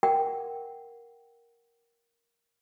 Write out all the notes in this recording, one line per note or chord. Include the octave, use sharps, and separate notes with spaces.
A#4 F#5 G5